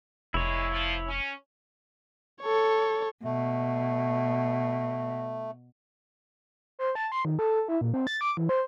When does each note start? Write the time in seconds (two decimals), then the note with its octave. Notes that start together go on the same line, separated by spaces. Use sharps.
0.34 F1 A#2 G#3 E4 C#5
0.71 F3
1.07 C#4
2.42 A4 C#5
3.24 B2 A3
6.79 C5
6.95 A5
7.12 C6
7.25 D#3
7.39 A4
7.68 E4
7.81 A#2
7.94 C4
8.07 A6
8.21 D6
8.37 E3
8.49 C5